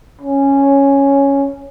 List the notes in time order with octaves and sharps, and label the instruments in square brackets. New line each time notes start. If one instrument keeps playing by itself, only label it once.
[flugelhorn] C#4